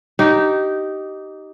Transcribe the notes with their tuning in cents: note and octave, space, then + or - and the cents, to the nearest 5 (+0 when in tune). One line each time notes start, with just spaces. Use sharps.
D#4 +0 G4 -20